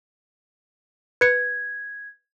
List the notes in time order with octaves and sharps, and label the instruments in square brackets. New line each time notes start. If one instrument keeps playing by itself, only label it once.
[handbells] B4 C#7 [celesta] G#6